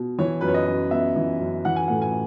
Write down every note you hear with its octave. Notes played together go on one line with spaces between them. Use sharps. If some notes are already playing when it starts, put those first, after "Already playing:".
Already playing: B2
E3 C#5
F#2 B4
C#5
D#5
F#2
B3 E5
E3
F#2
E3 F#5
G#5
A2 F#5
G#5